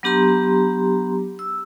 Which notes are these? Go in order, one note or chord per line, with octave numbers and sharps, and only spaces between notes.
F#3 B3 D4 G4 A#5 C6
E6